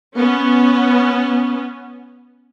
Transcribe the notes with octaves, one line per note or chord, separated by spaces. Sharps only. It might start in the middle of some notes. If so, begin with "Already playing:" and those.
B3 C#4